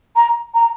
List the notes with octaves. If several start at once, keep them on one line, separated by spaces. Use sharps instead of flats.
A#5
A#5